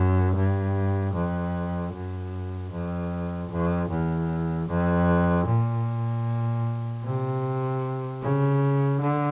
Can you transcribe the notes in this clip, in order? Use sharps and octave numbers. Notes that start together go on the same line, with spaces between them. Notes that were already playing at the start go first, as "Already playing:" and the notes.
Already playing: F#2
G2
F2
F#2
F2
F2
E2
F2
A#2
C3
C#3
D3